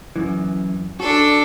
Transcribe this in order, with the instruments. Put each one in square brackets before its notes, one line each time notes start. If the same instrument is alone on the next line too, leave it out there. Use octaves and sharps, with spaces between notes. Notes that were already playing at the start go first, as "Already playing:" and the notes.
[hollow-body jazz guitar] F#2 E3
[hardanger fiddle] D4 A4 [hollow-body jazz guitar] F#4